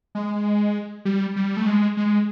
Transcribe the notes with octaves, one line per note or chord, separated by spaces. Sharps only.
G#3
G3
G3
A3
G#3
G#3